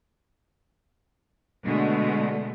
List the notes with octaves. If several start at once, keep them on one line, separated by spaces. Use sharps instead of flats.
B2 D3 G#3 A3